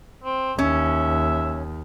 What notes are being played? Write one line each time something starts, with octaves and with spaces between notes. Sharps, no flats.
C4
D#2 C#4 E5